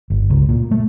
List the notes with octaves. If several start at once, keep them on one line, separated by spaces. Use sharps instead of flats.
G1
C#2
A#2
A3